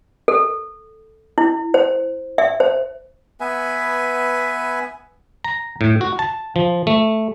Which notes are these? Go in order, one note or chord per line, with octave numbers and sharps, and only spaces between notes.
A4
E4
C5
E5
C5
B3 B4 E5 G#5
A#5
A2
F#4
A5
F3
A3